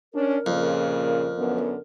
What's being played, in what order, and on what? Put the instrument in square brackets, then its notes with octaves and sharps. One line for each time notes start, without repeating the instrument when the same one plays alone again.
[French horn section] C#4 D4 [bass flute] A#4
[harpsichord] F2 [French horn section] A#2 C#3
[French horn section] F#2 D3 B3